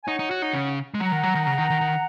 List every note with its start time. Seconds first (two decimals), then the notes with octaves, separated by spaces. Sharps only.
0.04 G#5
0.07 D#4 C#5 F#5
0.19 D#4
0.31 F#4
0.42 D#4
0.53 C#3
0.94 G#3
1.00 F#3 F#5 A#5
1.12 D#3
1.23 F#3
1.35 D#3
1.47 C#3
1.58 D#3
1.70 D#3
1.81 D#3